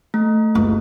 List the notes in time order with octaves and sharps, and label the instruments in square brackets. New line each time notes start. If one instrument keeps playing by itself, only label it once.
[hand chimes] A3
[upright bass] F#1 C#2